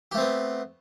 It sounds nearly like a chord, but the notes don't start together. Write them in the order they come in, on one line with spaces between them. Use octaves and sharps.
G4 A3 C4 B3